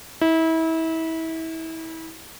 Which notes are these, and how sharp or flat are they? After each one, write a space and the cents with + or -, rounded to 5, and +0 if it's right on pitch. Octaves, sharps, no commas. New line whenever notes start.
E4 -30